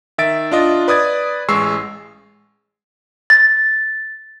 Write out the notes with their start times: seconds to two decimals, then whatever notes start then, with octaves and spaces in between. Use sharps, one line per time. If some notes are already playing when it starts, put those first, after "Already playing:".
0.18 D#3 E5 A6 D7
0.52 D4 F4 D#5
0.88 B4 D5 D#6 G#6 A6
1.49 A1 G#3 C#6 E6 C7
3.30 A6